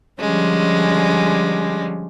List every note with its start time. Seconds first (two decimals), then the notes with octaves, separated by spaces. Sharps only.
0.20 D3 F3 G3 G#3 C#4